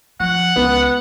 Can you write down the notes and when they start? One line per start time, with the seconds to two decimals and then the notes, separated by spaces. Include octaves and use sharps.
0.20 F3 F#5
0.56 C#2 B3